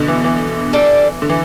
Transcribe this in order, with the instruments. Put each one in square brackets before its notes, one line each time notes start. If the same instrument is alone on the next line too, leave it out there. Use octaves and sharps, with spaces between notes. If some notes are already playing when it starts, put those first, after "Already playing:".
Already playing: [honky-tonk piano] B2 D3
E3
E3
[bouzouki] G3 D4 A4
[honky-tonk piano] D3
E3